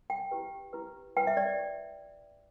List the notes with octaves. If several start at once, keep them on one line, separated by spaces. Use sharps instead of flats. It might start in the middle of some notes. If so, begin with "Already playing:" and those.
G5
E4 G4 B4
E4 G4 B4
E4 B4 G5
E5
D5